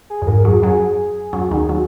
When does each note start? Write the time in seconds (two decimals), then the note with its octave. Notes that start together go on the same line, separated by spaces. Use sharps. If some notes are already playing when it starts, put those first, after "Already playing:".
0.10 G#4
0.22 F#2
0.27 G#2 A#4
0.45 F#2 F#3 G#4
0.62 F#2 F#3 G#4
1.33 F#2 F#3
1.51 D#2 D#3
1.69 F#3